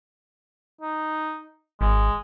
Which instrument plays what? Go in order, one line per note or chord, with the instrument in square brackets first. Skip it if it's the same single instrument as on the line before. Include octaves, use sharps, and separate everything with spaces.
[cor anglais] D#4
[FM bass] G#1 [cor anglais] G#3